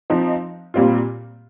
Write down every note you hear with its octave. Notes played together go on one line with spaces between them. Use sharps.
F3 C4 D#4
A#2 G3 C4 F4